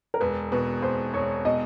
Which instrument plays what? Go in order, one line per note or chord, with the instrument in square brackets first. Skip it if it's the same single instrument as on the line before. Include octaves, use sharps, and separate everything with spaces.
[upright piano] A#4
[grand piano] E1 [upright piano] B4
[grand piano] B2 [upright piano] B4
[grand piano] E1 [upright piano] C5
[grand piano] E1 [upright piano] C#5
[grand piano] B2 [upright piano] D#5